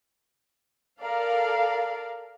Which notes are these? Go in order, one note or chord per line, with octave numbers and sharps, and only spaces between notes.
A4 A#4 D5 F5